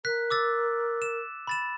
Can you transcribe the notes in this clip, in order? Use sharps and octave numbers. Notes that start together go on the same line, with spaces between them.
A#4 F#6 B6
D6 E6 A6
E7
B5 A6 E7